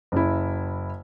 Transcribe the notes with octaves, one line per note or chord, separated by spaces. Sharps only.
F#1 E4